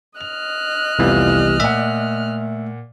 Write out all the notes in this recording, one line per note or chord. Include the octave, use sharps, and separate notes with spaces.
D#5 F6 F#6 F7
F1 C2 E3 B3 F4 G4
A#2 A3 E5 F#5